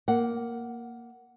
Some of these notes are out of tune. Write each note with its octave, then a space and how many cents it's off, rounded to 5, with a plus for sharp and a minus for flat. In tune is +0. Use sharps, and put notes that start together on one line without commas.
A#3 +0 F#5 +5